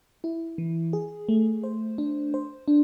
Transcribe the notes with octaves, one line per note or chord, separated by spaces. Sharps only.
E4
E3
G#4
A3
C5
D4
C5
D4